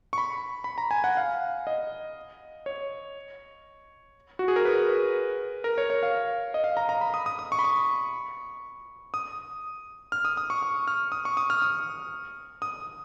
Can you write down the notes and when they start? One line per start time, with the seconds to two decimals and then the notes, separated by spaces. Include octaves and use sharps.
0.13 C#6
0.18 B5
0.64 B5
0.78 A#5
0.91 G#5
1.04 F#5
1.17 F5
1.67 D#5
2.66 C#5
4.39 F#4
4.48 G#4
4.56 A#4
4.65 B4
5.64 A#4
5.78 C#5
5.90 C#5
6.03 F5
6.54 D#5
6.64 F5
6.77 A#5
6.89 A#5
7.01 B5
7.14 D#6
7.26 D#6
7.39 D#6
7.52 C#6
7.59 B5
7.64 C#6
9.14 D#6
10.12 F6
10.25 D#6
10.37 D#6
10.50 C#6
10.62 C#6
10.88 F6
11.12 D#6
11.25 C#6
11.37 D#6
11.50 F6
11.62 D#6
12.62 D#6